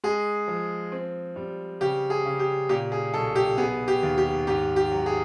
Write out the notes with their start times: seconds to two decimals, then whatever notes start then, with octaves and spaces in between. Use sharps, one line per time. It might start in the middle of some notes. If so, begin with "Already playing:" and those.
0.04 G#3 G#4
0.48 F3
0.92 C4
1.36 G3
1.81 C#3 G4
2.10 G#4
2.26 C#3
2.39 G4
2.69 A#2 G4
2.92 G#4
3.14 B1 A4
3.36 G4
3.58 B3 G#4
3.88 G4
4.03 D#2
4.18 G4
4.47 G#2 G4
4.76 G4
4.91 F#3
5.06 G#4